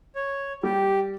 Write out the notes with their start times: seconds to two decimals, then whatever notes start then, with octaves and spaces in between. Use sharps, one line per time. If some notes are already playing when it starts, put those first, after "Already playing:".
0.15 C#5
0.63 G3 G4